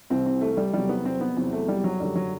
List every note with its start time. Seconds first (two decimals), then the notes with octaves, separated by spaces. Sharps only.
0.10 C2 C3 E3 C4
0.26 C4
0.41 A3
0.52 A3
0.57 G3
0.73 E2 C3 F#3 G3
0.89 B3
1.05 C4
1.21 B3
1.37 E2 C3 F#3 C4
1.53 A3
1.68 G3
1.84 F#3
2.00 F#2 D3 F#3 G3
2.15 F#3